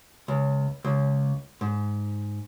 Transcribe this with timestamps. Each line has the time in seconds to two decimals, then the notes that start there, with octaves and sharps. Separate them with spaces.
0.28 C#2
0.85 C#2
1.61 G#2